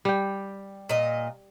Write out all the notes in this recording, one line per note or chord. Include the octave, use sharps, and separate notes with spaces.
G3 G5
A#2 D#5